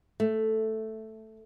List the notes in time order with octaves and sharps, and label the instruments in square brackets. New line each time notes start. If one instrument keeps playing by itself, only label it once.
[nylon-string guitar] A3